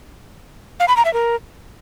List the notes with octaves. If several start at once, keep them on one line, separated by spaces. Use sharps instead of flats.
F5
B5
A#5
E5
A#4